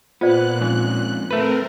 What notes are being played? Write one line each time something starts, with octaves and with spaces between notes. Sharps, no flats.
A#2 B3 F4 C5 D5 F#6
F2 G#2 C#4
A3 C4 A#4 B4